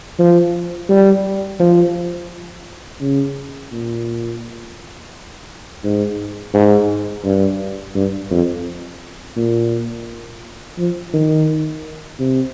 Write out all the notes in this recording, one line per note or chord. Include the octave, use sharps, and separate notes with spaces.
F3
G3
F3
C#3
A#2
G#2
G#2
G2
G2
F2
A#2
F3
D#3
C3